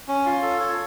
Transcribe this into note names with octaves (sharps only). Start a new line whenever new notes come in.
C#4
F4
A4
C#5